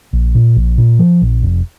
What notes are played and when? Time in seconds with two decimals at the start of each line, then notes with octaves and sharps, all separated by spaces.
0.13 A#1
0.35 A#2
0.56 A#1
0.78 A#2
0.99 F3
1.22 A#1
1.43 F1